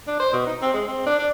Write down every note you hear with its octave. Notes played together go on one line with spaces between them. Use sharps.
D4
C5
B2
D#4
C4
G#3
C4
D4
D4